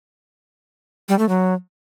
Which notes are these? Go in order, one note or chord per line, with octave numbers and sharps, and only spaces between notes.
G3
A3
F#3